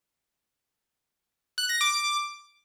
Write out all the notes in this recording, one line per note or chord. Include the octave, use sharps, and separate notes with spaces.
F#6
A#6
D6